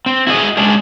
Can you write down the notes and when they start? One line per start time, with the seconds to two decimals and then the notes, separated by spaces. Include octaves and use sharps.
0.06 C4
0.27 E4 F#4 G#4 D#5
0.57 G#3 C#4 D4 G#4